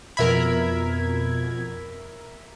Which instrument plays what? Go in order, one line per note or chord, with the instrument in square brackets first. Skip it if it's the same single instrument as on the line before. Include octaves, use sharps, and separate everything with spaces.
[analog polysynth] F2 B2 G#6 [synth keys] A#4 E5 B5